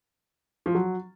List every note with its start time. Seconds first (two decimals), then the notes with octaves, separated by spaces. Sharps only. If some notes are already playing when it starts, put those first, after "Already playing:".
0.66 F3
0.75 F#3